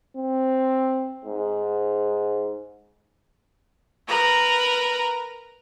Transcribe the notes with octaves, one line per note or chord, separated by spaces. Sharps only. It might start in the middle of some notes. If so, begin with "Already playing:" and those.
C4
G#2
A#4 B4 A#5